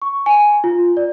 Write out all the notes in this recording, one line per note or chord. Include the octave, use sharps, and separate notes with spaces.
C#6
G#5
F4
D5